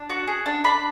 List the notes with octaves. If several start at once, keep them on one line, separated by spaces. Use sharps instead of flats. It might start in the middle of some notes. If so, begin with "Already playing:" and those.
Already playing: D4
F#4 F#5
G#4
D4
D4 B5